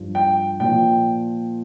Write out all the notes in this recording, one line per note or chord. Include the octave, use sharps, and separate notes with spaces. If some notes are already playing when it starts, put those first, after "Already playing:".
Already playing: G2 F3
G5
A#2 F3 G5